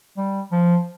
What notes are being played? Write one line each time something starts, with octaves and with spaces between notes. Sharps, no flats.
G3
F3